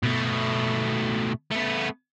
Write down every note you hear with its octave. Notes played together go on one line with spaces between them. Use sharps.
B2 A3
A3 B3